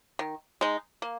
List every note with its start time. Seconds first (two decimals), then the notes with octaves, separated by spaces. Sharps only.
0.19 D#3
0.61 G#3 D#4
1.02 A#3